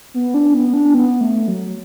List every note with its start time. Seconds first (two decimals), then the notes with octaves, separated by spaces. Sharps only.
0.14 B3
0.34 D4
0.54 B3
0.74 D4
0.94 B3
1.21 A3
1.48 F#3